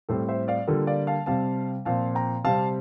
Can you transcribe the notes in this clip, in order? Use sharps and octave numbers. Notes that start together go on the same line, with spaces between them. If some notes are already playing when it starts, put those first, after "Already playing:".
A2 G3 C4 A4 C5
C5 E5
D5 F5
D3 G3 A#3 F4 A4
D5 F5
F5 A5
C3 G3 C4 F5 A5
A#2 F3 C4 F5 A5
G5 A#5
C3 G3 C4 F5 A5